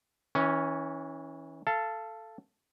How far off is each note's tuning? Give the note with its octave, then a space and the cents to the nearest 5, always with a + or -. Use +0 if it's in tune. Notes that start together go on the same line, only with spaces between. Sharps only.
E3 -30 C#4 +0
A4 +0 F5 -25 A5 +0